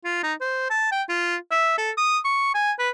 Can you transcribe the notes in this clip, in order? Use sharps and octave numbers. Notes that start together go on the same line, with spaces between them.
F4
D#4
C5
A5
G5
F4
E5
A4
D#6
C#6
G#5
B4